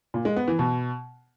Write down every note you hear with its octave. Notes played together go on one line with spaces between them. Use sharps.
A#2
G#3
B3
E3
B2